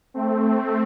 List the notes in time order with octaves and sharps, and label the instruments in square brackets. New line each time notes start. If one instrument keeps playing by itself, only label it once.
[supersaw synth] A3 C4